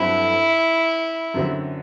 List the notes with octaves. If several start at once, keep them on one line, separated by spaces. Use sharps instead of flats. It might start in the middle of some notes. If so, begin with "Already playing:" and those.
Already playing: G2 F#3 C4 E4 F#4 A4
F#2 D3 F#3 C4